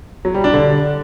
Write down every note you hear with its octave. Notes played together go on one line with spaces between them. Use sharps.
F#3
G3
D4
D3